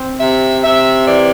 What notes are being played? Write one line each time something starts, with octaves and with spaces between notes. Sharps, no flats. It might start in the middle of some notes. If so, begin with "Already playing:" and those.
Already playing: C4
C3 E5
C3 E5
E3 D5